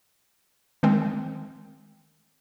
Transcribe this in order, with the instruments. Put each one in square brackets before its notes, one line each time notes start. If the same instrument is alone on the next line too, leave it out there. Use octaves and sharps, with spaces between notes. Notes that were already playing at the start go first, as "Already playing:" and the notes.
[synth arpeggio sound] D#3 G#3 C4